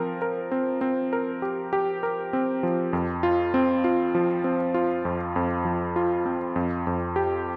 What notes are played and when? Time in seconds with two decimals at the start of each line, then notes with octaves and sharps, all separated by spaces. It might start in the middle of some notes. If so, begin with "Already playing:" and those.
Already playing: F3 C4 A#4
0.22 A#4
0.51 C4
0.81 C4
1.13 A#4
1.42 G4
1.73 G4
2.03 A#4
2.33 C4
2.63 F3
2.93 F2
3.23 F4
3.54 C4
3.84 F4
4.15 F3
4.44 C4
4.74 F4
5.05 F2
5.36 F2
5.65 F3
5.96 F4
6.25 C4
6.56 F2
6.87 F2
7.16 G4